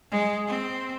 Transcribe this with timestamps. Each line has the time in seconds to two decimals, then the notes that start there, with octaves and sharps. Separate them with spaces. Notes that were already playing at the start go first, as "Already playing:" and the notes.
0.11 G#3
0.47 C4